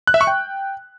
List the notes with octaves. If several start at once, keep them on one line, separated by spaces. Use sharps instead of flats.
F#6
E5
C#6
G5